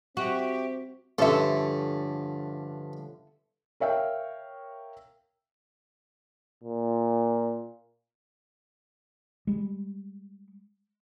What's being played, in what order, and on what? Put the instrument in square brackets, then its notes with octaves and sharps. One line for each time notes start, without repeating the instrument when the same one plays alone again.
[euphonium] C4 [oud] F#4 [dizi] G4 [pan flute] E5
[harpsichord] G2 [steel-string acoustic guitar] D3 F3 C#4 [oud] A4 E5
[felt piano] A#4 C#5 E5 F5 G5
[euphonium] A#2
[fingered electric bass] G3 G#3